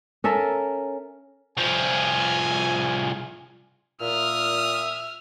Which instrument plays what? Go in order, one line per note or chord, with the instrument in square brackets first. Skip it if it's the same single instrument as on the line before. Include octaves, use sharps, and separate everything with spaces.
[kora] C#4 A4 A#4 E5
[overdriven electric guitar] C2 F3 [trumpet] G#5
[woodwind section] A#2 [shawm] E5 [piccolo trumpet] D#6 [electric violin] F6